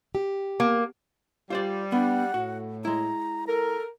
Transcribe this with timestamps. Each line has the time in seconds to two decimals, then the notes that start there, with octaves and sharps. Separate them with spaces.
0.15 G4
0.60 A#3
1.50 G3 F4 C5 D5
1.92 B3 D4 F#5
2.34 A2 F#4
2.85 G#3 E4 A#5
3.48 A4 A#4